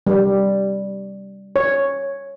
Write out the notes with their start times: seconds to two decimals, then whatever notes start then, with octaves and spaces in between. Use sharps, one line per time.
0.07 G3
1.56 C#5